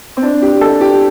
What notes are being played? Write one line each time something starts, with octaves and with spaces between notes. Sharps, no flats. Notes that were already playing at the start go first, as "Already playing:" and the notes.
C4
D4
G4
A4
G4